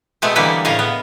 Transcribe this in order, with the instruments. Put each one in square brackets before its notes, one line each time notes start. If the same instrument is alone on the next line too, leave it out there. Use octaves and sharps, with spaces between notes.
[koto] B2 G#3 A3 B3 C4
D3 E3 G3 G#3 A#3 B4
A2 C#3 C#5 D#5 F5
B3